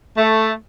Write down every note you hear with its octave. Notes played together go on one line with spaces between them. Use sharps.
A3